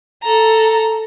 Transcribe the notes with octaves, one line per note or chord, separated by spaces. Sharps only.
A4 A#5